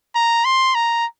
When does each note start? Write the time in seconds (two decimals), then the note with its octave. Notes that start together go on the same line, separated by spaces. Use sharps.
0.15 A#5
0.45 C6
0.75 A#5